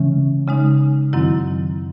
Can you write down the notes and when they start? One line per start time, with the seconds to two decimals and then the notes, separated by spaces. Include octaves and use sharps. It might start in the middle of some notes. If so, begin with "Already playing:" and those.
Already playing: C#3 E3 G#3 C#4
0.48 C#3 G#3 D#4
1.13 F#2 D#3 F#3 C4 E4